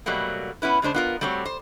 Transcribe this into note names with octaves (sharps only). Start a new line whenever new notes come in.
B2 F#3 G3 A3 A#3
B3 C#4 E4 B4
C#3 G#3 D4 C5
B3 F4 A#4
G3 A3 C4 F#4 C#5
C5